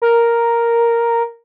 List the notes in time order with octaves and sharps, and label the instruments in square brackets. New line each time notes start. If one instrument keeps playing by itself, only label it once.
[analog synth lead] A#4